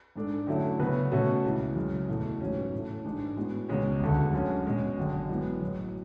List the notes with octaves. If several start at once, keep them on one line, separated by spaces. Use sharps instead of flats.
G#2 G#3 D4 A4 D5
D3 F#3 A3 C#4 E4
C#3 F#3 B3 F#4 B4
B2 A3 C#4 F#4 A4
C#2 C#3 E3
F#2 C#3 G#3
E2 B2 A3 E4
A1 G#2 F#3 C#4
A2 E3 A3
A1 G#2 G#3 D4
A2 G#3 B3 F#4
C#2 B2 G#3 C#4
E1 D2 D3 A3
F#2 D3 G#3 C#4
B2 G#3 C#4
G#1 F#2 D3 G#3
F#2 E3 G#3 B3
B1 A2 F#3